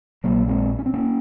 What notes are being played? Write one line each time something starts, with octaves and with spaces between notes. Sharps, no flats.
A#1 A#2 F#3 A#3
G#3 C4
C#4
C4
A#3 C#4